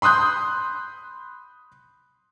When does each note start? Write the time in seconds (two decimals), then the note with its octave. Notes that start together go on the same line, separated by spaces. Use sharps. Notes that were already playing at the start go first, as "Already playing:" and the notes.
0.02 B5 C6 D#6 F#6 G6